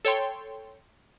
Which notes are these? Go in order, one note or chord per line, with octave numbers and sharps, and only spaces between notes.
A4 C#5 G5 C6